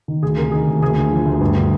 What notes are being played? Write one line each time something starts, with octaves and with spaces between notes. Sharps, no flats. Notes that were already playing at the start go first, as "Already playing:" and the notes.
D#3
D2 G#4
C3 A#4
D#3 G#4
D2
D2 G#4
D3
F3
D2
G2
D3